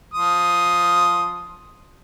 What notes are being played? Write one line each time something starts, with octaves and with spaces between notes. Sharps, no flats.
F3 C6 D#6